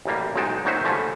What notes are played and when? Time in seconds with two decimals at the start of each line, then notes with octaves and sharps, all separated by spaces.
0.05 A1 F#2 G3 A#3
0.36 B1 G#2 G#3 D#4 G5 A5
0.65 A#1 F#3 D#4 F#4 C5 E5
0.85 D3 F3 G3 A3 C#4